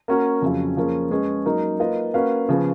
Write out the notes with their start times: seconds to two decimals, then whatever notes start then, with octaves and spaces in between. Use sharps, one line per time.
0.08 A#3 C#4 F#4 A#4
0.42 F2 C#3 F#3 C#4 F4
0.77 F3 A#3 C#4 G#4
1.11 G#3 C#4 G#4 B4
1.45 F#3 A#3 D#4 A#4
1.80 A#3 F4 B4 D#5
2.14 A#3 C#4 F#4 B4 F5
2.49 C#3 F3 B3